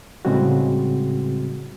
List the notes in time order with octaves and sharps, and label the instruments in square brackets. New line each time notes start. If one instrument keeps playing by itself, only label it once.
[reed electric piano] A2 C#3 G3 G#3 C4 F#4